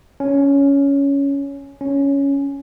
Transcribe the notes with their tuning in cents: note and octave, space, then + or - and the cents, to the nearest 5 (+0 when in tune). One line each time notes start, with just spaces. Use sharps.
C#4 +10
C#4 +5